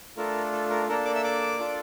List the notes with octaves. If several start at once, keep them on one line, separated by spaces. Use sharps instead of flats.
A3 D4 F4 A4 A#4
A4
A#4
A#3 D4 A4 A#4
D5 D6
E5 E6
D5 D6
D4 F4 A4